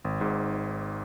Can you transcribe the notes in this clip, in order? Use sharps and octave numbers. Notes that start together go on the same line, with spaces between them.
G#1
G#2